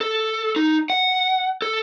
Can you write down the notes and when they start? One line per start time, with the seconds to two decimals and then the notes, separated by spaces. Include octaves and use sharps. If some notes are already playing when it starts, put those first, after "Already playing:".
0.01 A4
0.56 D#4
0.90 F#5
1.62 A4